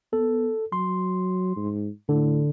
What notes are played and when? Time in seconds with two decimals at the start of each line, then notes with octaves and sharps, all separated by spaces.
0.13 B3 A4
0.72 F#3 C6
1.56 G#2
2.09 A2 D3